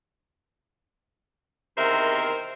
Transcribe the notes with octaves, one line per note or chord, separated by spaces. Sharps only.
E2 C3 D#3 A#4 C5 E5